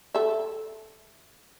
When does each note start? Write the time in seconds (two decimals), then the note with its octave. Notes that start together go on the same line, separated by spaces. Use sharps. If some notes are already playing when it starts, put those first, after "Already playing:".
0.14 A4 E5